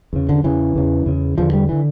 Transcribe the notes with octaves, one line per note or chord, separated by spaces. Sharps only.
E2 C#3
D3
E2 C#3 E3
E2 C#3
E2 C#3
E2 D3 F3
G3
D3 E3